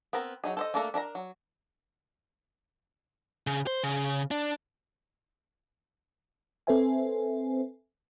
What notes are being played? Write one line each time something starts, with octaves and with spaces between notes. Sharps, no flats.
B3 C4 A#4
F#3 D#4 G#4
A4 C5 D#5
A3 A#3 D4 A4 A#4
D4 A4 A#4 A#5
F#3
C#3
C5
C#3
D4
C4 A4 B4 C5 E5 G#5